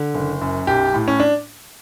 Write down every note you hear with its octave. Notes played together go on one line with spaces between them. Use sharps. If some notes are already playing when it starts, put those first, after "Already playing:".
Already playing: D3
F#1
F#2
B1 G4
A2
C#4
D4